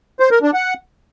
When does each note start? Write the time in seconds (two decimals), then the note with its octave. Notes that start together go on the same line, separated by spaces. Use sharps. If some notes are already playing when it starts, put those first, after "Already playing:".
0.20 C5
0.31 A#4
0.43 D4
0.54 F#5